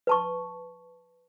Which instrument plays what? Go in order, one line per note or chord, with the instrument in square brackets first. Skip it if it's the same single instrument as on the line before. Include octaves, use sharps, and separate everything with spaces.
[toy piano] B4 A5 C#6